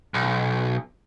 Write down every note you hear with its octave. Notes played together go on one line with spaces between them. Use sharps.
B1